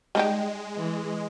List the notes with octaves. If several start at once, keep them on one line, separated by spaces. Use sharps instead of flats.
G3 G#3 D#4 G4
E3